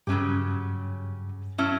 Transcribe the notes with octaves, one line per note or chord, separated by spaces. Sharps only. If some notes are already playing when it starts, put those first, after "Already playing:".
G2 C#3 F#3 C#4 G4
F#3 A3 C#4 E4